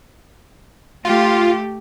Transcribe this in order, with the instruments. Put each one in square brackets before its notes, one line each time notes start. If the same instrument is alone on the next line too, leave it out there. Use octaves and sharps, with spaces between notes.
[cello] A3 G4 [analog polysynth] F4